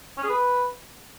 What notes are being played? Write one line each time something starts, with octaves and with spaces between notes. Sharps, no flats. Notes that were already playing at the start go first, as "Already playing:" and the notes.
C#4
G#4
B4